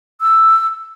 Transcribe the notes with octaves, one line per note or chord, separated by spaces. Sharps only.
E6